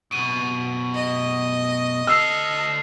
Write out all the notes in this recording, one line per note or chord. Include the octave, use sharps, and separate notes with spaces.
F#2 B2 D7 D#7
D#5
D2 A4 E6 F6 C7 F7